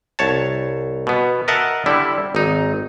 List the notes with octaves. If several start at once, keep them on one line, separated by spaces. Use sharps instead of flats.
C2 C#5 A5
B2 B3
A#4 D#5 E5 F#5 A5
D3 G3 E4
G#1 D#4